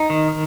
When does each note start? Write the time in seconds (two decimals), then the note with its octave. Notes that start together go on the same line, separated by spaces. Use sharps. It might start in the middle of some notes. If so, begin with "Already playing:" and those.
Already playing: D#4
0.10 D#3